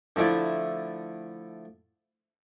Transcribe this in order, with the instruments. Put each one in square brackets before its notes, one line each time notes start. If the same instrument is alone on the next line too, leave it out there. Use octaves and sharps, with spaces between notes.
[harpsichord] D3 F3 A3 D4 E4